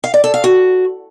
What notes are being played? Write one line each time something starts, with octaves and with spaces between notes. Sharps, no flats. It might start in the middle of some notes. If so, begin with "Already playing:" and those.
F5
D5
A4
F5
F#4